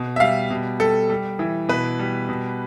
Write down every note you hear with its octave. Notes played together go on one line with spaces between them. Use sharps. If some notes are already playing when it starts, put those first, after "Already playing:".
Already playing: B2
E5
G3 F5
B2
G3 A4
G3
E3
B2 B4
G3
B2